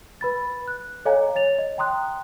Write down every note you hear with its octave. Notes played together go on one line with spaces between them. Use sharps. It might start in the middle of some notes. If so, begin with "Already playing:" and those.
B4 B5 A6
F#6
A4 C#5 D#5 F5 G#5 A#5
C#5 A6 F7
D#5
G5 A#5 C6 D#6 F#6